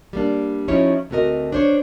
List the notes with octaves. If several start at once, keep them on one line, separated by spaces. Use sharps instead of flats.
G3 A#3 D4
F3 F#3 C#4 D#4 E4 C#5
D2 A3 C4 F#4 A#4 D#5
D4 C5 C#5